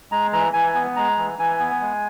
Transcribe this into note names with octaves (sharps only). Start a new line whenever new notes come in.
G#3 A#5
E3 A#5
E3 G#5
B3
G#3 A#5
E3
E3 G#5
B3
G#3